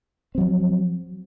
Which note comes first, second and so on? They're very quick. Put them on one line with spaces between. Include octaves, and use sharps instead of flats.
C4 F#3 F3